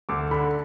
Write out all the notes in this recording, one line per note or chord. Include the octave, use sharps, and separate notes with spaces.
D2 D6
D3 B5